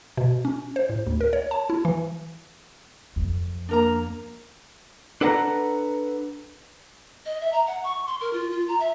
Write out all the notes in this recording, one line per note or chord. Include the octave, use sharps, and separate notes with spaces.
B2
C#4
C5
A2
D2
A#4
C#5
A5
E4
E3
F2
A#3 D4 A#4 A#5
D4 A4 B4 F#5 G#5 A#5
D#5
E5
A#5
F#5
C#6
C6
A#4
F4
F4
A#5
E5